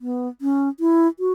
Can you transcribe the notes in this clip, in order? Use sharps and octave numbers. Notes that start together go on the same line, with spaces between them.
B3
C#4
E4
F#4